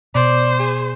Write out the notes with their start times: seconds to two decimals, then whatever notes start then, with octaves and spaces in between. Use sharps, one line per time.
0.15 B2 C5 D5
0.60 G#4